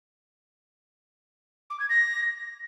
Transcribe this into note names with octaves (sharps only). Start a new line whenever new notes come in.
D6
G#6
A#6